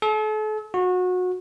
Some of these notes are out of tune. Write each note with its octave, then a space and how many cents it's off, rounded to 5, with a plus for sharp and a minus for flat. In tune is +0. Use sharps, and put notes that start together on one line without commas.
A4 -40
F#4 -25